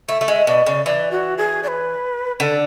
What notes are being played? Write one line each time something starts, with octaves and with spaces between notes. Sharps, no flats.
A3 E5
A3
G#3 E5
B2 D5
C#3 D5
E3 D5
F#4
G#4
D5
B4
D3 A4